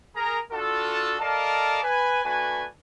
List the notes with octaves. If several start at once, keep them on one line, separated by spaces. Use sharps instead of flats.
G#4 A#4 A#5
D4 F4 F#4 A4
A4 A#4 D5 D#5 F5 A5
B4 G#5
A3 D4 F#4 B4 G#5